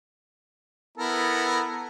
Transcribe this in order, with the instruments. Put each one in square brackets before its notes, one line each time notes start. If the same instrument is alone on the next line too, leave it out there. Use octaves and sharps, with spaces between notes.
[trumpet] B3 [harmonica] E4 A4 A#4